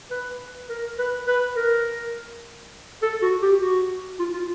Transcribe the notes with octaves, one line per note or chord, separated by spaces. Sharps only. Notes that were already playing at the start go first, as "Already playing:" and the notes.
B4
A#4
B4
B4
A#4
A4
F#4
G4
F#4
F4
F4